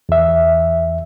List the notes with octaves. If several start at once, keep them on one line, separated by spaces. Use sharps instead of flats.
E2 E5